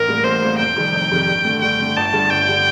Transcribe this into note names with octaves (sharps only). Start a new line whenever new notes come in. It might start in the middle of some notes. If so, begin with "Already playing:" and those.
Already playing: A1 A#4
A2 G3 A#3
A1 C5
A2 G3 A#3
F1 G5
F2 C3 D#3 G3
F1
F2 C3 D#3 G3
G2
D3 A3
G2 G5
D3 A3
G1 A5
G2 D3 G3
G1 G5
D3 G3